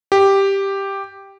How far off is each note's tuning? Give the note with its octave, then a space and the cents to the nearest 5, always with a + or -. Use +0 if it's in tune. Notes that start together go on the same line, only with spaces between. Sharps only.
G4 +0